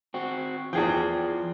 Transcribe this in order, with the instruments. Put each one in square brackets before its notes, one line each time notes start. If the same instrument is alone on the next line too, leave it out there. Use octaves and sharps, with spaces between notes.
[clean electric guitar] C4 F#4
[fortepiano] E2 G#4 G5 [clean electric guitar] F3